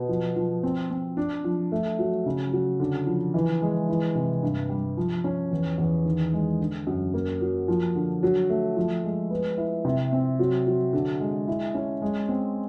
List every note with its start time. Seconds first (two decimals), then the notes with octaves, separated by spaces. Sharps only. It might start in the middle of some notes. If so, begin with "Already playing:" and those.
Already playing: B2
0.09 F3
0.36 F3
0.63 C4
0.91 C4
1.17 D4
1.44 F3
1.72 A3
1.99 F#3
2.26 C#3
2.53 F#3
2.80 D3
3.07 F3
3.34 E3
3.62 G#3
3.89 E3
4.15 C3
4.43 G2
4.69 G3
4.97 F3
5.24 C#4
5.51 E2
5.78 E2
6.05 D#3
6.33 G#3
6.60 D3
6.87 F#2
7.14 A#3
7.41 F#3
7.68 F3
7.95 D3
8.23 F#3
8.50 A3
8.76 F3
9.04 G#3
9.30 B3
9.58 E4
9.85 C3
10.12 C4
10.39 F#3
10.67 F#3
10.93 D3
11.20 G#3
11.48 E4
11.75 C#4
12.02 G#3
12.29 C4